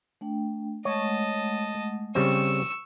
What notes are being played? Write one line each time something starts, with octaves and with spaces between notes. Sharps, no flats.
A3 D4 G5
G#3 A3 C#5 D#5 F#5 A5
C#3 G3 C4 C#6 E6